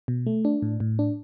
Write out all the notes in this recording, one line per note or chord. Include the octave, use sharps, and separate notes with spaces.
B2
A3
D4
A2
A2
D4